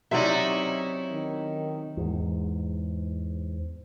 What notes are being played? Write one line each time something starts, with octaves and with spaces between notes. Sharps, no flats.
C3 F#3 C#4 D#4 E4 D5 E5
D#3
E2 G#2